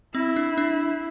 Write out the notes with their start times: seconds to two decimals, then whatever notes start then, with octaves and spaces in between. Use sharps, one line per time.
0.15 C4 E4
0.36 D4
0.58 D4